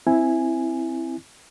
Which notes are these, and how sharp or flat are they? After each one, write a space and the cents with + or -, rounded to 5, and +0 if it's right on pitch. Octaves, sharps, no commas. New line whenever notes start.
C4 +0 E4 +0 G#5 +0